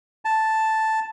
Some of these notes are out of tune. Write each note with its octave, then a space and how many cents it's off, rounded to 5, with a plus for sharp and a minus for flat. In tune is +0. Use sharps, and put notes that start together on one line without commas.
A5 +0